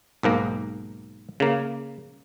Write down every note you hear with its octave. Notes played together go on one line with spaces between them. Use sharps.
B1 G#2 A#3 A#5
C#3 A#3